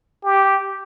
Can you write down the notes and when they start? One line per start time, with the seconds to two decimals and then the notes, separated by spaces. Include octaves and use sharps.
0.24 G4